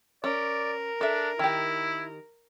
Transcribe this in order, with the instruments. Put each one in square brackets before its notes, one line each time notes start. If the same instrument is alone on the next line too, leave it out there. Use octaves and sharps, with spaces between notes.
[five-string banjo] C#4 [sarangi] A#4 [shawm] D5
[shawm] D4 [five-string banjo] A4 E5
[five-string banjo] D#3 G4 [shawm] E4